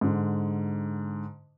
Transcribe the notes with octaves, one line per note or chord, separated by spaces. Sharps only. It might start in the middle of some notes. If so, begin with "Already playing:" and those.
G#2 D3